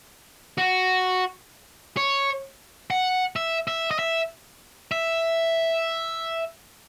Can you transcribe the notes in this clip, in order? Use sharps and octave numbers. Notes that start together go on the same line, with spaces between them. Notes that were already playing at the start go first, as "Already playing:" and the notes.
F#4
C#5
F#5
E5
E5
D#5
E5
E5